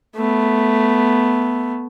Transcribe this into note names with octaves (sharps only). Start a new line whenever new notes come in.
A3 B3